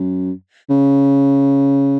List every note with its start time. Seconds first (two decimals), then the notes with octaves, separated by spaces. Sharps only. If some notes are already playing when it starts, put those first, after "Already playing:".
Already playing: F#2
0.70 C#3